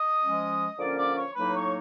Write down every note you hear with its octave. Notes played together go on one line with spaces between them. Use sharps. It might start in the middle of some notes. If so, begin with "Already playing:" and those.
Already playing: D#5 D#6
F3 G#3 C#4
D3 F3 A#3 C#4 D5 D6
D5 D6
C#5 C#6
A2 F#3 A#3 D#4 B4 B5
C#5 C#6